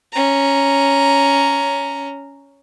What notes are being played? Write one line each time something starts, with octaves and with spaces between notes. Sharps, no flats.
C#4 A#5